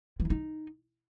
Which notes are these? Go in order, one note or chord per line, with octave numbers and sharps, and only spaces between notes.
E3
E4
D#4